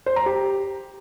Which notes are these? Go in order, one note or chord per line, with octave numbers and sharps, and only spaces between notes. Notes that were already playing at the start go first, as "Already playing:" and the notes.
C5
A#5
G4